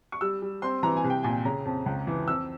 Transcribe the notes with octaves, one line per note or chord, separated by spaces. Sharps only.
C#6
G3 E6
G3
C4 C6
E3 A#5
G#5
C2
G5
A#2 G#5
C#3 A#5
F2
C#2
E3
F2 E6